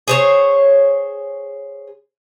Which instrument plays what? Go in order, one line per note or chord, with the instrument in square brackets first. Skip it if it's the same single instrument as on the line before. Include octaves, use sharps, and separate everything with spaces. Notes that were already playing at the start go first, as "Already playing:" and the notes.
[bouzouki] G#4 C5 C#5